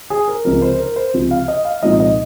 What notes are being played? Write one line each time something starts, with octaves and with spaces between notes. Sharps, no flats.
G#4
A#4
C#2 C3 F3 A#4
C5
A#4
C5
C#2 C3 F3
F5
D#5
F5
C2 A#2 F3 G#3 D#4 D#5
D#5